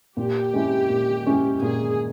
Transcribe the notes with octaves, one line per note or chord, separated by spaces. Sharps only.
A#2 G4
G#3 C#4 E4
A#2
G#3 C#4 E4
A#2 G#4